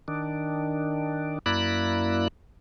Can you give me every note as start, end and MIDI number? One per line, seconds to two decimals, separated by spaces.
0.08 1.39 51
0.08 1.39 62
1.46 2.28 42
1.46 2.28 58
1.46 2.28 64
1.46 2.28 74
1.46 2.28 83
1.46 2.28 90